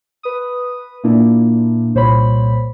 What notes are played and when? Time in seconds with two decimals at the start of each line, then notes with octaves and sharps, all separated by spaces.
0.23 B4 D#6
1.04 A#2 A#3 D4 E4
1.94 C2 A#2 C5 C#5 B5